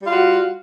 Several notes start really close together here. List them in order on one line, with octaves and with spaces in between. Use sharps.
G3 F4 F#4